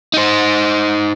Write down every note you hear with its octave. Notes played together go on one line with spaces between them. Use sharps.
D#4 C5